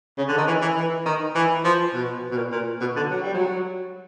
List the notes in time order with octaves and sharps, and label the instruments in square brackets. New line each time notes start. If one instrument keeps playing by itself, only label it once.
[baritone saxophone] C#3
D3
D#3
E3
E3
E3
D#3
E3
F3
B2
B2
A#2
A#2
B2
D3
F#3
G3
F#3